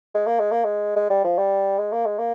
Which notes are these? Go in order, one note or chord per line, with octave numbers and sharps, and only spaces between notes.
G#3
A#3
G#3
A#3
G#3
G#3
G3
F3
G3
G#3
A#3
G#3
A#3